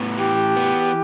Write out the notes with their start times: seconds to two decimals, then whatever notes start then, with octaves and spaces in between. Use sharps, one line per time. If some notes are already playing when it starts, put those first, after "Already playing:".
Already playing: A2 B3
0.18 E3 G4
0.56 B3